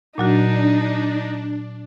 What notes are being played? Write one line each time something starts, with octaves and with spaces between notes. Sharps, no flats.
A#2 F#3 D4 D#4 F#4